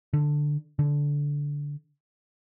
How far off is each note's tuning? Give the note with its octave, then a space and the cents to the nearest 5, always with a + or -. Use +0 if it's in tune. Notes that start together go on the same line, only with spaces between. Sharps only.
D3 +5
D3 -15